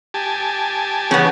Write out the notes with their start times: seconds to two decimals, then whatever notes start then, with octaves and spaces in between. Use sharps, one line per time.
0.14 G4 G#5 A5
1.11 C#3 E3 B3 C#4 G#4